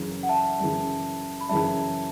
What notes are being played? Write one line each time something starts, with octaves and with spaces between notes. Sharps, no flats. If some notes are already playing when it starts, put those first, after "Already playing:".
Already playing: F#2 C#3 E3
F#5
E5 A5
F#2 C#3 E3
B5
F#2 C#3 E3 E5 A5